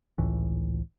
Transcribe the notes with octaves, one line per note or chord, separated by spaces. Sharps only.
G#1 C#2 A2 E3